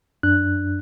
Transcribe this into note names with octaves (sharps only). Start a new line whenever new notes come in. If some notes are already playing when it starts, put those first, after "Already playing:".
F#2 D4 F#6